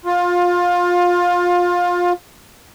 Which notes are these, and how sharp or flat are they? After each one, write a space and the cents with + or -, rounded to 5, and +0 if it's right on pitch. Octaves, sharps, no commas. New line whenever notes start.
F4 +20